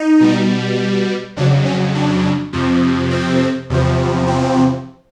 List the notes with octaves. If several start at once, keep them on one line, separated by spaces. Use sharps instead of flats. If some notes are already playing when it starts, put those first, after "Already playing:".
Already playing: D#4
B2 G3
F2 C#3 F#3 D4
C#4
D4
F2 C3 F3
C4
E2 C3 F3
C4